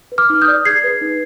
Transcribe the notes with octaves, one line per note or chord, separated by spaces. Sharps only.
B4
D6 F6
D#4
D#6 G6
D5
G#4 G#6 C7
B4
D#4